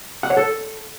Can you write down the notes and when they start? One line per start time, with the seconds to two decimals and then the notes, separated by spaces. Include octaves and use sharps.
0.23 F#5
0.30 C#5
0.37 A4